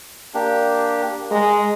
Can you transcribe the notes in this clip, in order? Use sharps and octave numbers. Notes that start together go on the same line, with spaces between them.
A#3 D4 G4
G#3 A#5